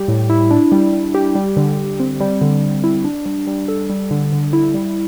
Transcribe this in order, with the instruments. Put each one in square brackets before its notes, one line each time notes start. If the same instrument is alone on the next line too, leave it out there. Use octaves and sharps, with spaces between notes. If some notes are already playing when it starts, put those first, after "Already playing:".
Already playing: [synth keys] G3 G4
A2
E4
D4
G3
G3
G4
G3
D3
D3
C4
G3
D3
D3
E4
D4
G3
G3
A4
G3
D3
D3
E4
G3